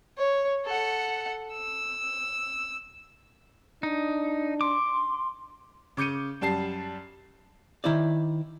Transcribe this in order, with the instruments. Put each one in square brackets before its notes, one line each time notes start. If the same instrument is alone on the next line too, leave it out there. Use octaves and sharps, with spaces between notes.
[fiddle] C#5
A4 F#5
E6
[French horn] D4 [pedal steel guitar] D#4
[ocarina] C6 [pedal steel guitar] D6
[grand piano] C#3 D6 G6 C#7 D#7
F#2 G3 A5 C7
[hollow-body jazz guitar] D#3 E4 C5 D5